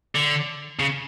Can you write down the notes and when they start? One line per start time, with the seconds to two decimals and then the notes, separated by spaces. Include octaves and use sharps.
0.15 D3
0.80 C#3